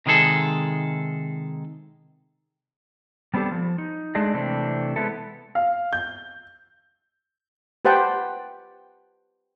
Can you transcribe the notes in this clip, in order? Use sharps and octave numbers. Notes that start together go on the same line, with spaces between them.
C3 D#3 G#3 G#4 A4
G3 B3 C4 D4 G4 A4
F3
D#4
G#3 A3 D4 G#4 D#5
C3 E3 A3 C4 D4
G#3 B3 E4 A4
F5
G6
G4 B4 C5 F#5 G5 A5